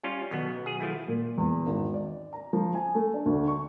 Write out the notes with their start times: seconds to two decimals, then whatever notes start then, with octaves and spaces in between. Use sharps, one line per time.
0.03 G3 C#4 F4
0.31 B1 B2 D#3 F#3 B3
0.66 G#4
0.80 F3 A3 E4 G#5 A6
1.08 A#2
1.38 E2
1.66 G#1
1.94 D5
2.33 A#5
2.53 F3
2.75 G#5
2.95 A3
3.14 D4
3.26 D2
3.48 C#6